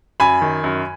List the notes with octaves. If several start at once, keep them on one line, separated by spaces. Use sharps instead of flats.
F#2 G#5 B5
D#3
F#2